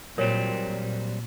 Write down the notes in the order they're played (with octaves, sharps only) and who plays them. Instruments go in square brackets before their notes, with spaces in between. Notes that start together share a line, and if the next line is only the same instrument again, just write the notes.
[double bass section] A#2 [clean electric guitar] F#3 G3 C4 [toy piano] A#4 C#5